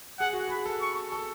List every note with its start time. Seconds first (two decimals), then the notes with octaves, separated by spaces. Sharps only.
0.20 G#4 F#5
0.33 F#4
0.48 G#4 B5
0.66 A4
0.81 C#6
1.12 A4